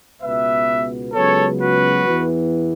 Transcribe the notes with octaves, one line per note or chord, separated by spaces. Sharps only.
C#2 B2 B3 B4 E5
C#2 C#3 F#3 B3 A4 C#5
F#4 B4
E2 E3 B3